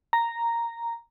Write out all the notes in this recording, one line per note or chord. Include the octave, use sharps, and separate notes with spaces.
A#5